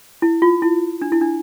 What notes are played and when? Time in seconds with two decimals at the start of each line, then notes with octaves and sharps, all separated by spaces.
0.22 E4
0.42 F4
0.62 E4
1.02 D4
1.12 E4
1.21 D4